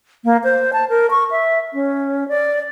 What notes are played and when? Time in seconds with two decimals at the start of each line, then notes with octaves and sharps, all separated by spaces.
0.25 A#3
0.44 C5
0.73 A5
0.89 A#4
1.11 C#6
1.31 E5
1.74 C#4
2.28 D5